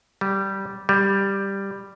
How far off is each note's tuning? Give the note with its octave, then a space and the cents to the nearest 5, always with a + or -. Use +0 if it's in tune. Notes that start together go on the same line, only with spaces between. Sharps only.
G3 -10
G3 +5